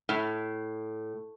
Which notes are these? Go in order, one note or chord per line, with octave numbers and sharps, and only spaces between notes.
A2